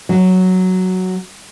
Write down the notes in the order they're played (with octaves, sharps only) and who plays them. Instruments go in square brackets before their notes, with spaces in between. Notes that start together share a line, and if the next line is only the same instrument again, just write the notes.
[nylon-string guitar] F#3